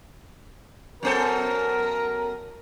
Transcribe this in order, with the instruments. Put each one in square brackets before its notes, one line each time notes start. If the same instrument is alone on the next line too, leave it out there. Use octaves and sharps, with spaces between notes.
[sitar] F#2 B3 A4 [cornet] A#4